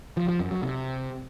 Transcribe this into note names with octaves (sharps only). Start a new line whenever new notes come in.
F3
F3
F#2
F#3
C3